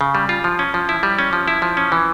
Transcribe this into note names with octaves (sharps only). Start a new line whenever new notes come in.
C#3
G3
F4
F3
C#4
F3
E4
G3
C#4
F3
E4
F3
C#4
E3